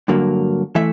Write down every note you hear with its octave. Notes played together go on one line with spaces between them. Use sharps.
G2 D3 F#3 A#3
E3 A3 E5